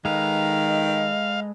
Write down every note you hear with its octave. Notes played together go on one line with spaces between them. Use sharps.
D#3 G#3 A4 B4 D#5 F5